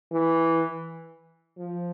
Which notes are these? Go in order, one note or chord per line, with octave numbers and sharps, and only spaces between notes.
E3
F3